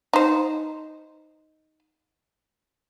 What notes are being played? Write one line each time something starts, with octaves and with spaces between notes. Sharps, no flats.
D#4 C5